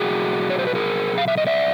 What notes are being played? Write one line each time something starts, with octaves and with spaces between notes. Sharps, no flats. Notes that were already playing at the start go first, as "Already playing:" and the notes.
Already playing: B2 F#3 A3 F#4 G#4
C#5
C5
B4
G#4 A#4
F5
E5
D#5
D5 E5